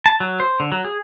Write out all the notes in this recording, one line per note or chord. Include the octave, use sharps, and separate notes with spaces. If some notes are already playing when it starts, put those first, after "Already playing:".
A5
F#3
C5
D3
F#3
G#4